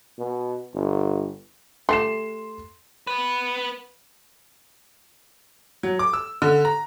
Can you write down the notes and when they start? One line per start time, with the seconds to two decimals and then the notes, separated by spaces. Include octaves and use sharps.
0.18 B2
0.73 G1
1.89 A3 G4 C6 C7 E7
3.07 B3 B4
5.83 F#3
5.99 D6
6.13 E6
6.42 D3
6.65 A#5